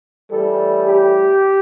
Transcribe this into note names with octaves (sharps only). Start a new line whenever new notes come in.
A2 E3 G3 A4
G4